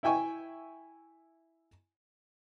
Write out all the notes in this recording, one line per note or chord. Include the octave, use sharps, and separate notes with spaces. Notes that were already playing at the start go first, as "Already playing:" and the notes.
E4 E5 G5 G#5 C#6